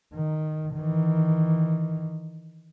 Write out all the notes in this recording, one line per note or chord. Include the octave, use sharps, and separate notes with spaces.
D#3
D#3 E3